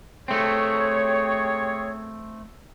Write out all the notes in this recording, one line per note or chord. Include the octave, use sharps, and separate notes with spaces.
A3 C4 G4 G#4 C#5